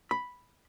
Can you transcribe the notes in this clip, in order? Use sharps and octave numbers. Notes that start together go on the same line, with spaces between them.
B5